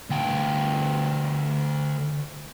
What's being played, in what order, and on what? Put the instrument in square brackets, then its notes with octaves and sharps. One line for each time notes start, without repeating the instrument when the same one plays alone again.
[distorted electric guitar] D2 G5